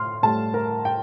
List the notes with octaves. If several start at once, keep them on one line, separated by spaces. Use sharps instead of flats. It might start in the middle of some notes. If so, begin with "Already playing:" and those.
Already playing: A2 C6 F6
A2 G3 A5
A#4
G5